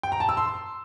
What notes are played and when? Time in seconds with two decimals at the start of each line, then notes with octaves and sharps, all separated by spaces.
0.03 G5
0.12 A#5
0.20 A5
0.29 E6
0.37 C6